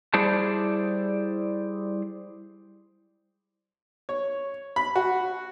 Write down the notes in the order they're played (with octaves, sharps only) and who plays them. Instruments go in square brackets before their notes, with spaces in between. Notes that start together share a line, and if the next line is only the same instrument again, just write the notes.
[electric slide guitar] G3 E4 G#4 C5 D5 A5
[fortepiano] C#5
B5
F#4